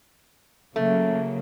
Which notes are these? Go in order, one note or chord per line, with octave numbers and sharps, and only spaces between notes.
C#3 F#3 A3 A#3